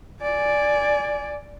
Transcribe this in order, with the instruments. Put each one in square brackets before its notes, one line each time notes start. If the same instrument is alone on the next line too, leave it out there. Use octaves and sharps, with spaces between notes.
[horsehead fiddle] D5 G#5